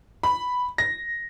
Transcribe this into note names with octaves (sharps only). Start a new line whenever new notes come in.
B5
A#6